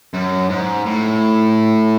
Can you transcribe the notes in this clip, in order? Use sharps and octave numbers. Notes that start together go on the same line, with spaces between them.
F#2
G#2
A2